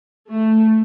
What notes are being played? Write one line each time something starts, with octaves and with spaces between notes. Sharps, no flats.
A3